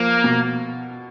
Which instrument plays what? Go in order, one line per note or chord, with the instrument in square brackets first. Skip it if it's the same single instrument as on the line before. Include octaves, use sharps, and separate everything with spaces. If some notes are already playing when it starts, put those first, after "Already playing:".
Already playing: [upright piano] F3 [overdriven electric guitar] A#3
[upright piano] B2